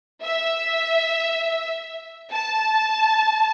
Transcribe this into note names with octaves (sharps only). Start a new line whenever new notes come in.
E5
A5